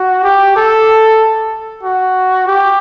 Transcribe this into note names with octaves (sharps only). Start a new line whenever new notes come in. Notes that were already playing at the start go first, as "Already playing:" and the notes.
Already playing: F#4
G4
A4
F#4
G4